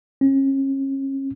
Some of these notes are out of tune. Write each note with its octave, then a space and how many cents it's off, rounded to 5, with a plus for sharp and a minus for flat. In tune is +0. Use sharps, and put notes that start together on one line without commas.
C#4 -35